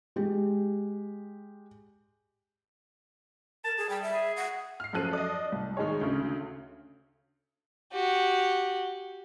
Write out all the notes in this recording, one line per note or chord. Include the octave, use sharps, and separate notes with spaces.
G#3 G4
A#4 A5
G#4
G3 G5
E5
G#4
F#5
F6 C7
F#2 F3 A4 F#6 D#7
D5 D#5
C2
D#3 G#3 D#4 G#4 C#5
D2 C#3
F#4 G4